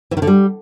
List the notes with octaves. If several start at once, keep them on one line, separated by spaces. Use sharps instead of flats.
E3
D#3
D3
G3